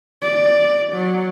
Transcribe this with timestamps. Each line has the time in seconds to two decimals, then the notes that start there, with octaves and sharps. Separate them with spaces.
0.22 D5
0.93 F#3